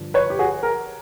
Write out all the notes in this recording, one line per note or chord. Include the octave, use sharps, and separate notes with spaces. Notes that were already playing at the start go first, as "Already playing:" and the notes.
Already playing: G2 D3 F3
B4 C#5
G4
F#4 G#4
G#4 A#4